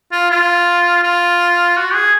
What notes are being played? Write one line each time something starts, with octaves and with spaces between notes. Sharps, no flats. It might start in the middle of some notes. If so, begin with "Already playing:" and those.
F4
F4
F4
F#4
G#4